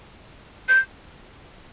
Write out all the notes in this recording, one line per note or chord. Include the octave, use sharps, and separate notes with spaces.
G6